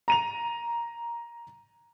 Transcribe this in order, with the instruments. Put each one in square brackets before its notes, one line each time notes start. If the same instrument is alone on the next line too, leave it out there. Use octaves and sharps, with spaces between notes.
[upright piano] A#5 D#7 F7